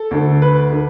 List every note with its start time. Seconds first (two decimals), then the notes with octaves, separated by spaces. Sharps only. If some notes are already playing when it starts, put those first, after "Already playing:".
Already playing: A4
0.11 D2 D3
0.42 B4
0.72 D3